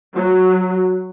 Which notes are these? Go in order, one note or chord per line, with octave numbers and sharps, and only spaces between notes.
F#3